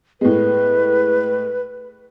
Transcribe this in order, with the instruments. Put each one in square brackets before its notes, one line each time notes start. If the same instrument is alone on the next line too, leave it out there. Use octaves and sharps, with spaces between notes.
[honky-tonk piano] A2 G#3 [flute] B4